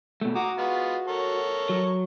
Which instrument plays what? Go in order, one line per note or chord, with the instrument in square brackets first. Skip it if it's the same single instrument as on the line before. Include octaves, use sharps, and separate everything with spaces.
[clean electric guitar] B2 A3
[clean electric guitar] F#4 [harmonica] A#5 D6 D#6
[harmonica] G#3 B3 F4
A4 A#4 C#5
[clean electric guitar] F#3